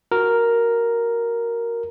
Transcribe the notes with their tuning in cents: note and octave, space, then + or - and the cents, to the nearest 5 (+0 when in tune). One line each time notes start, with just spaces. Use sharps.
F#4 +0 A#4 +0